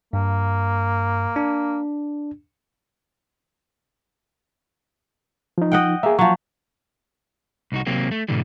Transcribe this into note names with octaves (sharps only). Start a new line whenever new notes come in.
G2 A#3
D4
F3 D#4
D#5 F#5 G5
A#3 G#4 E5
F3 F#3 C#6
C2 D#4 F#4
C3 F#3 A#3 C4
A3
G#2 B2 D3 E3 G3